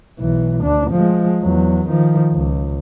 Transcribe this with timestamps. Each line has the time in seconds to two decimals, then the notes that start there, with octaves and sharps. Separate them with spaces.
0.19 B1 E3
0.62 D2 D4
0.91 F3 G#3
1.41 E2 F#3
1.88 D#3 F3
2.32 C#2